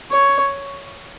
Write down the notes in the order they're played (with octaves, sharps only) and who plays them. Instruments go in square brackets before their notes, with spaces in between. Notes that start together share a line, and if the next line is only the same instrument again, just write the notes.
[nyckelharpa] C#5